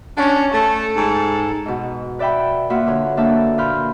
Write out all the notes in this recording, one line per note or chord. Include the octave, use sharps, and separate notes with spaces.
C#4 D4
A3 A4
G#2
G#2 B2
B4 D5 E5 G5 B5
A#3 F4 F#4 B4 E5 F#5
D3 B4 C#5
A#3 D4 A4 B4 E5 A5
A#2 F4 B5 F6 G6